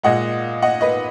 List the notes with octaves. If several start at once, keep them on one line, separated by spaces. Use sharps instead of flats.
A#2 G#3 D#5 F#5
D#5 F#5
B4 D#5